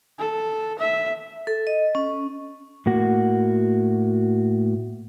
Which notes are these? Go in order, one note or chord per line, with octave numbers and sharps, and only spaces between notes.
A4
E5
A4
D#5
C#4
A2 A#3 F#4